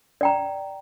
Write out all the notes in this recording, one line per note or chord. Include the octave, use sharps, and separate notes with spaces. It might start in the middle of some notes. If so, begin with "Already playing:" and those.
D5 G5 A#5